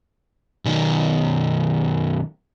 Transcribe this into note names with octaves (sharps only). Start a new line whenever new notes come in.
B1 D#3